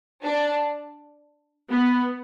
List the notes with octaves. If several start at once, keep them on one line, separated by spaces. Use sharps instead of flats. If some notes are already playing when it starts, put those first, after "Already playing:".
D4
B3